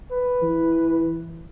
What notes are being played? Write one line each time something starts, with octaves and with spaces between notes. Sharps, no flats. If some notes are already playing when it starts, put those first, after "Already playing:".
B4
E3